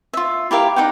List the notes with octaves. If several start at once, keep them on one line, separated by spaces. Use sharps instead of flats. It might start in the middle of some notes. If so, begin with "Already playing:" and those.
F4 E5
E4 G4 A#4 F5
D#4 D5 F#5 G5